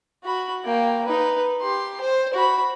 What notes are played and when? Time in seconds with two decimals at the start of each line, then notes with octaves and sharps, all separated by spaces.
0.24 F#4 B5
0.65 A#3 G5
1.04 D#4 B4
1.61 G4 C6
2.00 C5
2.34 F#4 B5